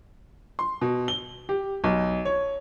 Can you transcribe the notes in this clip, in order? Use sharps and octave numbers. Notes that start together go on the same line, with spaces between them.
C6
B2
G7
G4
B1
C#5